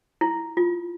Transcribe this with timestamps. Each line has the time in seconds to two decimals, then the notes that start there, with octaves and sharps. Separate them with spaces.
0.21 E4
0.57 F4